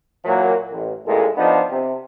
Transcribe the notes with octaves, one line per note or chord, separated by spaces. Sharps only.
A#2 E3 F#3 A#3
A1
A1 D#2 A#2 E3 G#3 A4
F3 B3 D4 D#4
C3